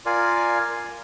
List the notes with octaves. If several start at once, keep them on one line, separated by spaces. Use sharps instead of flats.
F4 A#4 D5 F5 G#5